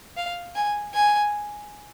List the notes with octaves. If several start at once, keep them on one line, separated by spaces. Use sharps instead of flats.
F5
G#5
G#5